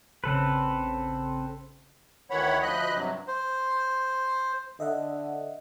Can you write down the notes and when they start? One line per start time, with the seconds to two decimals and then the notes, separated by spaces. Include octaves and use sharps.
0.24 A1 C#3 C4 A4 B4
2.30 D2 D#3 E3 C#5 F#5 B5
2.62 D2 F3 D#5 B5 F#6
2.94 G2 C3 F#3
3.27 C5
4.80 D3 D#5 E5 F#5